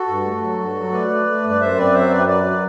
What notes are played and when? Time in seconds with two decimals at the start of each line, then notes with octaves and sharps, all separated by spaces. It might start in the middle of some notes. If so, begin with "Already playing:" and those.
Already playing: F#4 A4
0.08 G2
0.25 A3
0.41 F#3
0.59 G2
0.76 F#3
0.92 A3 B4 D5
1.10 A3
1.27 A3
1.44 G2
1.50 D5
1.60 F#2 C5 E5
1.77 C4 B4 D5
1.94 F#3 C5 E5
2.11 F#2 B4 D5
2.28 F#3 B4 D5
2.46 F#3